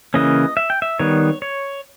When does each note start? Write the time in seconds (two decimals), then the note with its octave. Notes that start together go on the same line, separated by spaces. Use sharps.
0.14 C#3 E3 A#3 C#4 D#5
0.57 E5
0.70 G5
0.82 E5
0.99 D#3 G3 B3 C#5
1.42 C#5